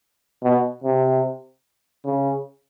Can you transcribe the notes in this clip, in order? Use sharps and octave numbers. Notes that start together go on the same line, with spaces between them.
B2
C3
C#3